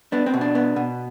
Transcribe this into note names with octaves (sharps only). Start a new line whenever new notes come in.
B3 D4
C4
B2
D4
B3
B2